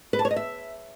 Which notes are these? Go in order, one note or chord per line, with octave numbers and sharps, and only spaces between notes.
B4
A5
C#5
D#5
E5